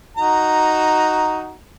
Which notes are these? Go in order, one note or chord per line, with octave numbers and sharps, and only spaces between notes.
D#4 F#4 A#5